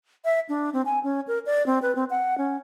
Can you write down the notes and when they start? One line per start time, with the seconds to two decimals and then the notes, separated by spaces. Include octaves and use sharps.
0.25 E5
0.49 D4
0.73 C4
0.86 G#5
1.04 C#4
1.27 A#4
1.46 D5
1.66 C4
1.82 B4
1.95 C4
2.10 F#5
2.38 C#4